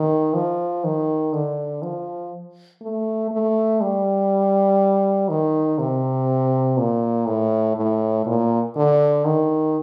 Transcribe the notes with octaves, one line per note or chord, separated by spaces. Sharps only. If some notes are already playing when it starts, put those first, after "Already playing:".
Already playing: D#3
F3
D#3
D3
F3
A3
A3
G3
D#3
C3
A#2
A2
A2
A#2
D3
D#3